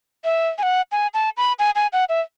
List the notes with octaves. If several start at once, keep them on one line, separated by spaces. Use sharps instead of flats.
E5
G#5
F#5
G#5
A5
B5
G#5
G#5
F#5
E5